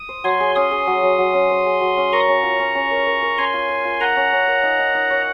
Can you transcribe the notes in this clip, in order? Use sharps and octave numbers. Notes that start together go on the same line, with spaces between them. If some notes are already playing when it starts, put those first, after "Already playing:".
Already playing: D#6
C5
F#3 G#5 C6
G#4
C#4 C6 D#6
G#4
F#3
F#3
F#3
C#4
C5
G#4
F#3
C#4
A#4 A#5 C#6
C#4
F4
C#4
C#4
A#4
A#4
A#4
C#4 G#5 C6
F4
A#4
F4
A#4 F#5 A#5
C#4
C#4
A#4
D#4
D#4
D#4
C#5